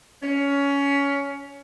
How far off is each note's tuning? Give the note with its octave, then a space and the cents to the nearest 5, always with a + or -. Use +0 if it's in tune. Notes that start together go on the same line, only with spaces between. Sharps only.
C#4 +20